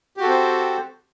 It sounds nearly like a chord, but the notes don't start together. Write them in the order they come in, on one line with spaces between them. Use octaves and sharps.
G4 F#4 A4 C4 C5